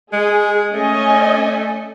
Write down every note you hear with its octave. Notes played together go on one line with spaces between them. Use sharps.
G#3 G#4
A3 C#4 D#5 G#5